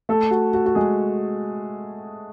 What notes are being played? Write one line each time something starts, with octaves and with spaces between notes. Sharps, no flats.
A3 A4
F#4
F#4
F#4
G#3 G#4